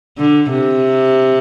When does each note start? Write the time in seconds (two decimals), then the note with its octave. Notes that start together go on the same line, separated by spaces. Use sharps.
0.18 D3
0.51 C3